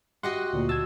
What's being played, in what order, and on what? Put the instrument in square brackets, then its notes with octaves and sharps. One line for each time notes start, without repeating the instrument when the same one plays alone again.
[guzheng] F#4 D#5 F#5 [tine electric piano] G4 C6
[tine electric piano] D2 A#2
[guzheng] A5 [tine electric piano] E6 G#6